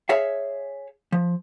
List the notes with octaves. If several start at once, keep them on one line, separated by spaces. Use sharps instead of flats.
G#4 C#5 E5 F5
F3